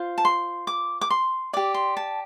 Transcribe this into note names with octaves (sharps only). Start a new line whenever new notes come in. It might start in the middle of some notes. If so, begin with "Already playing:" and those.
Already playing: F4 C5
A5
C6
D6
D6
C6
G4 D5 D6
C6
A5